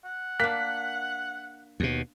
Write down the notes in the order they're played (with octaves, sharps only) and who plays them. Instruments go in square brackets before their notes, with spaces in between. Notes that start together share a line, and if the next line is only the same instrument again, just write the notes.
[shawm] F#5
[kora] A#3 D4 [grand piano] F#6 B6
[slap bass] D#2 B2